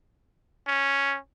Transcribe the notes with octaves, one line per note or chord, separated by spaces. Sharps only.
C#4